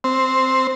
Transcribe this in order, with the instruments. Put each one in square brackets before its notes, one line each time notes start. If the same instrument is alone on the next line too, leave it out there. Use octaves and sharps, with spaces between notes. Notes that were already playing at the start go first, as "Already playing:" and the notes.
[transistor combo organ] C4